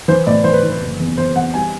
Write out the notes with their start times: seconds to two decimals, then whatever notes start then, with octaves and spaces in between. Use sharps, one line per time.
0.08 E3 C5
0.27 A2 D5
0.44 E3 C5
0.53 B4
0.62 E3
0.69 B4
0.82 F#1
1.00 E2
1.17 E2 C5
1.36 E2 F#5
1.54 G3 G#5